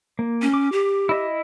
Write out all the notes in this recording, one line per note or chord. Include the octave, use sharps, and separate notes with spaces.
A#3
C#4
D6
G4
E4 D#5 E5